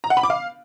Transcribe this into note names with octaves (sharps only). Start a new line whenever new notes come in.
A#5
F#5
B5
D6
F5